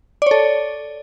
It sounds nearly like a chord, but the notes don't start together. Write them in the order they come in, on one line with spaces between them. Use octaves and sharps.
D5 C#5 A4